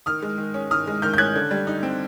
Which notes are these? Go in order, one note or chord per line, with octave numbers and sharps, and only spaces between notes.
D#3 D#6 F6
G#3
D#3
C#4
D#3 D#6 F6
G#3
D#3 F6 G6
G6
C#4 F#6 G#6
D3
G3
D#4
C4